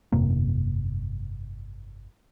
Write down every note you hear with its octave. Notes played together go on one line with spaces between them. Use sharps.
G1 F2 C3 A#3